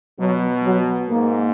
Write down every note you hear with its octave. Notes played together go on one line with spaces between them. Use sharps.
B2 F#3
F#3
G#2 A#3